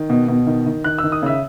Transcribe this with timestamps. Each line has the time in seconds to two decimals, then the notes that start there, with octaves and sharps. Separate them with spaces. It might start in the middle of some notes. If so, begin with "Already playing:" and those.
Already playing: D#3
0.10 B2
0.28 B2
0.47 D#3
0.66 D#3
0.84 D#3 F#6
0.98 E6
1.04 D#3
1.12 D#6
1.22 C#3 E5 E6